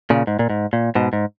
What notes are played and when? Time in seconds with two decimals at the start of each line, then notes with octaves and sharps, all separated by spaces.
0.10 A#2 C#3
0.27 G#2
0.39 A#2
0.50 G#2
0.73 A#2
0.95 G#2 B2
1.13 G#2